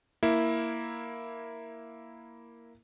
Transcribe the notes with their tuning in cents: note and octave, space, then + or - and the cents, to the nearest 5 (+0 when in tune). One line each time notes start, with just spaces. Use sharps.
A#3 +0 E4 +0